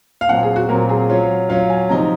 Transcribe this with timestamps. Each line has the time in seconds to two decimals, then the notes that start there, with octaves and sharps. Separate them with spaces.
0.21 F5
0.29 A#2 F#3 C4 F#5
0.43 G#4
0.56 F#4
0.69 A#2 F#3 C4 A#4
0.89 G#4
1.09 F#3 C#4 F4
1.49 F#3 C#4 F4 F5
1.70 G#5
1.89 C3 F3 C4 D#4 A#5